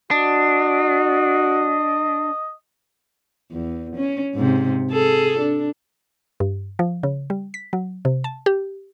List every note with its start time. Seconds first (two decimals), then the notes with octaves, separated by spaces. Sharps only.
0.11 D4 F#4 D#5
3.51 E2
3.96 C#4
4.34 G#2 C3
4.91 G#4 A4
5.39 D4
6.40 G2
6.79 F3
7.03 C#3
7.30 G3
7.54 B6
7.73 F#3
8.05 C3
8.24 A5
8.46 G4